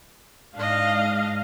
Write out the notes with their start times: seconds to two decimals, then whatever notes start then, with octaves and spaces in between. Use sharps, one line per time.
0.56 G#2 D4 D#5 F5